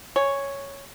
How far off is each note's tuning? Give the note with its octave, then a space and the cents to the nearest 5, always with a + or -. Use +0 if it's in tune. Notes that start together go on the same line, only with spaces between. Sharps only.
C#5 +0 G#5 +0